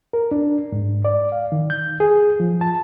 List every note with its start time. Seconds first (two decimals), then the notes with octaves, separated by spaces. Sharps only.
0.13 A#4
0.31 D4
0.72 G#2
1.05 D5
1.32 F5
1.52 D#3
1.70 G6
2.00 G#4
2.40 F3
2.61 A5